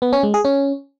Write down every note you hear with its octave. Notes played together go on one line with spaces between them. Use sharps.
B3
C#4
G#3
G#4
C#4